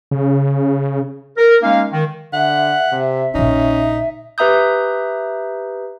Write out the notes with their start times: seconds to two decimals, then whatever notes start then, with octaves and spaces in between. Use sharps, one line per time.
0.11 C#3
1.37 A#4
1.63 G#3 A#3 C#4 D#4 F5
1.92 D#3
2.33 D3 E5 F#5
2.92 C3
3.35 A#1 C#3 C#4 D#4
4.38 G4 B4 E5 A#5 D#6 G6